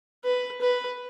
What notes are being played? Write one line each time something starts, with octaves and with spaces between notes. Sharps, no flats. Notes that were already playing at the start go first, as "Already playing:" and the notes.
B4
B4